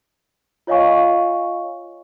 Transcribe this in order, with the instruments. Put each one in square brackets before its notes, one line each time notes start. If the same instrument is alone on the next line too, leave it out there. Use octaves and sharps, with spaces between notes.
[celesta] F4 C#5 D#5 F5 G#5 C#6